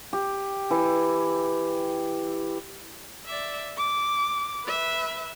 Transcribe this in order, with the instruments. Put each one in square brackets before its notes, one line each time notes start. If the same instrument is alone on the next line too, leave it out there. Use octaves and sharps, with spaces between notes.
[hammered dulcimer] G4
E3
[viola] D5 E5
D6
B4 E5